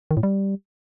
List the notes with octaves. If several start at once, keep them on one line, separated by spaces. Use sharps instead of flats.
D#3
A2
G3